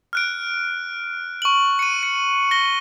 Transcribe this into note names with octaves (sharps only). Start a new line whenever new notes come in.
F6 F#6 D7
C#6 F#7
C#7 D#7
C#7
A#6 G7